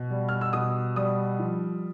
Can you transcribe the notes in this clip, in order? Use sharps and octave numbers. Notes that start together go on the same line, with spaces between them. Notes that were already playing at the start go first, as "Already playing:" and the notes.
Already playing: B2
G3
F6
E6
B2 D#6
G3 D#6
F3